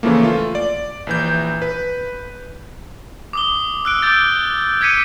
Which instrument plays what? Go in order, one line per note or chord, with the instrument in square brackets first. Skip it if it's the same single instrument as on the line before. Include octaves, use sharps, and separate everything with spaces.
[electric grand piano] C#3 E3 F3 A3 A#3
A3 F4
D5
A#1 E3 G6
B4
[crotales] D6 D#6 G7
E6 F#6 D7
D6 G6 A6
D6 G#6 B6 C#7 D#7